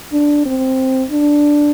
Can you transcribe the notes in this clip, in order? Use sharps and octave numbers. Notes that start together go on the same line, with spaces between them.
D4
C4
D4